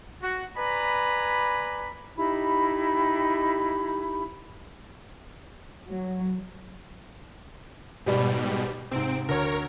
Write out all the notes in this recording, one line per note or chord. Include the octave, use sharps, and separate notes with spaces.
F#4
B4 D5 G#5 A#5 B5
D#4 E4 G4 B5
F#3
G#2 B2 G3 G4 D5 B5
G#2 C3 C4 D7
D2 A#4 C#5